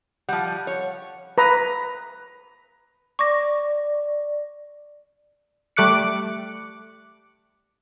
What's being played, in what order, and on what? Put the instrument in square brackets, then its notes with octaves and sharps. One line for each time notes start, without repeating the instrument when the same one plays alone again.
[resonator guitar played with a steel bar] F3 G3 [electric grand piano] F#5
[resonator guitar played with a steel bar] C#5
[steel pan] B4 A#5
[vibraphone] D5 [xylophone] C#6 D6 A#6
[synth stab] G3 A3 D6 F#6 C#7